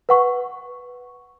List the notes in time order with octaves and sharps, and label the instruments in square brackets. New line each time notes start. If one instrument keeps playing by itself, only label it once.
[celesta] B4 F#5 C#6